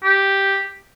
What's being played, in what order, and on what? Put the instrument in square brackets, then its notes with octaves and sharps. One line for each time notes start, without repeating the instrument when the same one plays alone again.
[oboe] G4